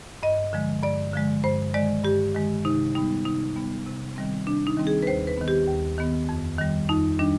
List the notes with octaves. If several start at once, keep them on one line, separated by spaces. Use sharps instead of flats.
G2 D#5
D3 F3 G#3
G2 D5
D3 F3 G#3
G2 C5
D#3 G#3 D5
G2 G4
D#3 G#3
C3 D#4
G3 B3 D#4
C3 D#4
G3 B3
C3
D#3 G3 C4
C3 D4
D#4
D#3 G3 C4
G#4
B4
D#2 C5
B4
D#3 B3
G4
D#2
D#3 B3
F2
D#3 G3
F2 D#4
D#3 G3 D4